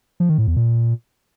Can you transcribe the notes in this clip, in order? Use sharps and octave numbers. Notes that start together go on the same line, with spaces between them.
F3
D#3
A2
E2
A#2